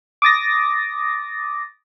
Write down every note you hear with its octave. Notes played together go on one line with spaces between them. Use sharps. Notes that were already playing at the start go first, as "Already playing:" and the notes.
D6 D#6 A6 A#6